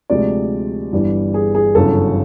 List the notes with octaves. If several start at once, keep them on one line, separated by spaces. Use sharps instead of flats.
D2 C3 F3 G#3 D5
G1 G2 E3 G3
G#4
G#4
G1 F#2 C#3 E3 A4